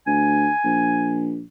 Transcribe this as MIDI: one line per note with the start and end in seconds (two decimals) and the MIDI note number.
0.07 0.49 38
0.07 1.29 80
0.64 1.43 34